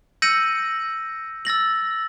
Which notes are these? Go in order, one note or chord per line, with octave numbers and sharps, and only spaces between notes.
E6 G6 A#6 C#7 D#7 F#7
E6 A6 A#6 F#7